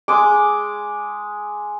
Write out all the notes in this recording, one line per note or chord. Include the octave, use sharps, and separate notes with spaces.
G#3 G#5 D6